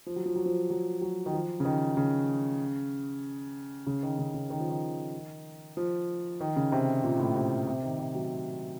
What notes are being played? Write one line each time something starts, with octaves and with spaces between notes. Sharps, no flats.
F3
F#3
F3
F#3
F3
F#3
F#3
D#3
F3
C#3
D#3
C#3
C#3
D#3
C#3
C#3
D#3
F3
D#3
F3
D#3
C#3
C3
A#2
A2
C3
C3
D#3
C3
F#3